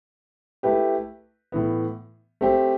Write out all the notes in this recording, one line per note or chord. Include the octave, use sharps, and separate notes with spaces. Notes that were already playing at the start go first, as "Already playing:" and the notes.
A3 E4 G4 B4
A2 E3 B3
A3 C4 G4 C5